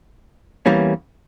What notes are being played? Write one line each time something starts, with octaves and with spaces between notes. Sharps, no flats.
E2 E3 G3 A#3 C#4